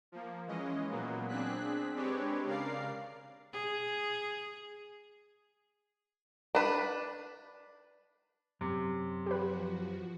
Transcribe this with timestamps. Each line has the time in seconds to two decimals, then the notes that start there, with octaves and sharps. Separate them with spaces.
0.12 F3 A#3
0.47 E3 G#3 C#4 D#5
0.90 A#2 F#3 A#3 B3
1.28 C4 D4 G#4 F#6 B6
1.95 G#3 C4 D4 G4 B4 C#5
2.45 C#3 A#4 D5 F5 C7
3.53 G#4
6.55 D4 B4
8.61 F#2 C3
9.26 F3 F#4 G4 B4